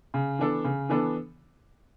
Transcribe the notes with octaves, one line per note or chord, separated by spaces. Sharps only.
C#3
E3 B3 D4 A4
C#3
E3 B3 D4 A4